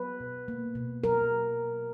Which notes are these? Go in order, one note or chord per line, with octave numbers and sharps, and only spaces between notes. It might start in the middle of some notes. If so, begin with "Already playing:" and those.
Already playing: F#3 B4
B2
A#3
B2
F#3 A#4